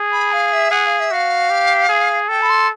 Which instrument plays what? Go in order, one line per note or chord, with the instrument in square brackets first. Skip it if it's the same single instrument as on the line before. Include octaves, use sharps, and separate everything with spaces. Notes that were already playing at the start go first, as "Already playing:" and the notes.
Already playing: [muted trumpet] G#4
[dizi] B5
F5
E5
[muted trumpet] G#4 [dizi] F#5
[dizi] F5
E5
[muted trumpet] F#4 [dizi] F5
[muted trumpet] G4
G#4
[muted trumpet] A4 [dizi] G5
[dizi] B5
C6